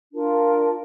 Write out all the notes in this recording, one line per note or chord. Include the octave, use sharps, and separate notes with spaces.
D4 F4 A#4